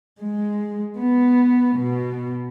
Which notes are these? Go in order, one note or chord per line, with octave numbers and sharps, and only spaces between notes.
G#3
B3
B2